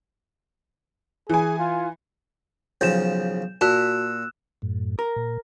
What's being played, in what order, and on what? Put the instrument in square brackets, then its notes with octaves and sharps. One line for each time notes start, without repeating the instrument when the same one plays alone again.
[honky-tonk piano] E3 G#5 [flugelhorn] G#4
[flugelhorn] F4
[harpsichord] B1 C#3 F3 [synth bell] G6 E7
[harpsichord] A#2 [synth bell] F#4 A5 [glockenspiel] E6 F#6 E7
[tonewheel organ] F#2 A2
[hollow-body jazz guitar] A#4
[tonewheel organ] A#2